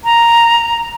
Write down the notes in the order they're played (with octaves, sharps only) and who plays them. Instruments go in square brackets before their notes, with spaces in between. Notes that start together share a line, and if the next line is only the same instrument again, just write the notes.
[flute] A#5